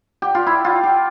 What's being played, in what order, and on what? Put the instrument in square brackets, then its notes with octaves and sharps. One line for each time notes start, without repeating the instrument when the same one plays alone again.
[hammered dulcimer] G4
F4
E4
F4
G4